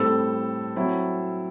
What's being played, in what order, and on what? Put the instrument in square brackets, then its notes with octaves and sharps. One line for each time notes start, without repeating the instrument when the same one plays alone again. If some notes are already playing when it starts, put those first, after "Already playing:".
Already playing: [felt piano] A2 G3 C4 [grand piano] A4
[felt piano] F#3 C4 E4